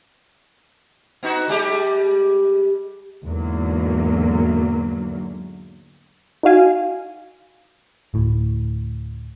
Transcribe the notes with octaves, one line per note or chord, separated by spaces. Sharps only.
B3 D#4 F#4
G3 G#3 G4
E2 G#2 D3 F#3 A#3
D#4 E4 F#4 F5 G#5
D1 A2